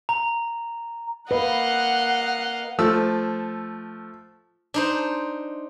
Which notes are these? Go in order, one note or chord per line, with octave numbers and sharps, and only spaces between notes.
A#5
A#3 B4 D#5 F5 F#5
F3 A3 E6
D4 D#4 C5